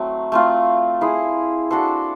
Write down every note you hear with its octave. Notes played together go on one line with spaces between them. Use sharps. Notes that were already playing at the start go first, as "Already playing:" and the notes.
Already playing: F#3 A3 C4
A3 C4 F4
E4 G#4 C5
D4 F#4 A4 C5